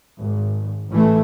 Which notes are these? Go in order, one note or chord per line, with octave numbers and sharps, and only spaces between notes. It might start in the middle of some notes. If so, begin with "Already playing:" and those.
G#1
A1 E3 A3